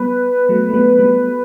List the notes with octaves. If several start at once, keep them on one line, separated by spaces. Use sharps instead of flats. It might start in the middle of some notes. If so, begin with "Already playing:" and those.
Already playing: G3 B3 B4
F#3 A3
A3
G3 B3
G3 B3